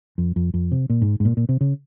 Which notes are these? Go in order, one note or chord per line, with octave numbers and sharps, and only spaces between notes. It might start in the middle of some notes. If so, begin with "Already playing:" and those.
F2
F2
F2
C3
A#2
G#2
G#2
A#2
A#2
C3
C#3